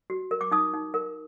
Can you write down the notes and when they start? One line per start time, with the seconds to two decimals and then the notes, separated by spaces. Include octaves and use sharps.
0.10 F#4
0.31 A#4
0.41 D6
0.51 D#4 D#6
0.74 D#4
0.94 A#4